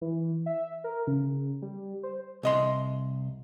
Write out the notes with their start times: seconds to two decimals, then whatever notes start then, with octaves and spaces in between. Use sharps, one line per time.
0.01 E3
0.46 E5
0.84 A#4
1.07 C#3
1.62 G3
2.03 C5
2.43 C2 D#5 C6